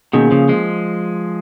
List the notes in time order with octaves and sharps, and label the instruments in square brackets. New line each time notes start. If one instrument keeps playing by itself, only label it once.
[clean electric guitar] B2 D#3 [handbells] A#3 C#4 G#4
[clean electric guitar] C#3 F3
F3 G#3